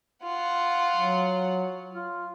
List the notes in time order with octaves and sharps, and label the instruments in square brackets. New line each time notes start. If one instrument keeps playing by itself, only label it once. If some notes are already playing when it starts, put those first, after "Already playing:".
[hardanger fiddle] F4 F#5
[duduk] F#3
F4